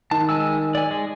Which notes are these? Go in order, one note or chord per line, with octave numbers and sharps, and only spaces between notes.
D#3 A5
G#3 G#5 E6
D5 G#5
G#3